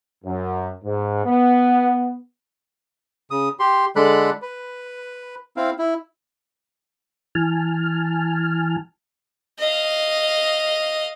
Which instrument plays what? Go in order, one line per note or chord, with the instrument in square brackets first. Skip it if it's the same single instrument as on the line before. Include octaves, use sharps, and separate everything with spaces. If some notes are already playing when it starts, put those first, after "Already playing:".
[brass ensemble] F#2
G#2
B3
[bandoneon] C#3 D#6
G4 C6
D3 G#3 A4 D5 B5 F#6
B4
C4 E4 F5
E4
[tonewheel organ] E3 G#5 A5 F6
[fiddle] D#5 F5